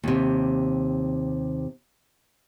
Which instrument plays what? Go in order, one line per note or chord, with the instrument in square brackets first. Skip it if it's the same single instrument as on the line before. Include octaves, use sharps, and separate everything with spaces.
[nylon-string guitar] D#2 C3